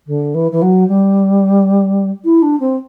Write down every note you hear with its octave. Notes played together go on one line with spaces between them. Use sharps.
D3
E3
E3
F#3
G3
E4
D4
C4